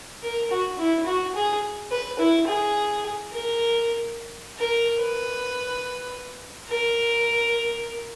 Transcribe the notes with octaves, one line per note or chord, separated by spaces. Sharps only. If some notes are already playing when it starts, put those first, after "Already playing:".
A#4
F#4
E4
F#4
G#4
B4
E4
G#4
A#4
A#4
B4
A#4